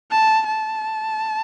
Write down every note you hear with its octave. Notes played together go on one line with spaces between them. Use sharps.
A5
A5